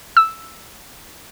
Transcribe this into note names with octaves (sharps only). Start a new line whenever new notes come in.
E6